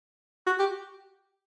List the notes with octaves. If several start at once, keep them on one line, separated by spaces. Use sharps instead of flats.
F#4
G4